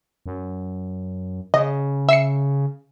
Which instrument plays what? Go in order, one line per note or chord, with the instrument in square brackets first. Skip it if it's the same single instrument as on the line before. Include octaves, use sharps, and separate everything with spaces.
[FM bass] F#2
[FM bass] C#3 [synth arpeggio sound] D#5
[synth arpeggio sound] E5 C7 C#7